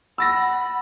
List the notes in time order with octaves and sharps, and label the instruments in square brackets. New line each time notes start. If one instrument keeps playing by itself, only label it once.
[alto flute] F#5 [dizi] B5 [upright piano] E6 A6 A#6